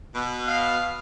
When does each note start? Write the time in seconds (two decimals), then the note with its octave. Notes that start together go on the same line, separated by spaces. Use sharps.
0.15 B2
0.47 F5